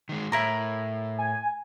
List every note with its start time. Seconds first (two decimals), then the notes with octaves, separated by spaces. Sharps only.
0.09 D#3 G#3
0.32 A2 E4 A#4 A#5
1.18 G#5